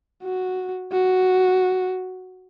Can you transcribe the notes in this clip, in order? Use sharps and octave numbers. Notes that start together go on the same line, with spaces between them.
F#4
F#4